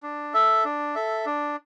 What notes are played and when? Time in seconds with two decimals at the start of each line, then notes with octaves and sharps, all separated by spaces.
0.03 D4
0.34 A4 E5
0.65 D4
0.95 A4 E5
1.26 D4